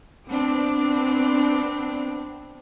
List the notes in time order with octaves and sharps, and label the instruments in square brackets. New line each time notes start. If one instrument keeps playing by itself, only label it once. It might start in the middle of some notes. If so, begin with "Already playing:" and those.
[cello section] B3 C4 D4